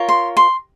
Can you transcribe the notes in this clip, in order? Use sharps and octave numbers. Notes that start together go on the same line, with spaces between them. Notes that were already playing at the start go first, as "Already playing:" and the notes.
Already playing: F4 A#4 C#5
C6
C6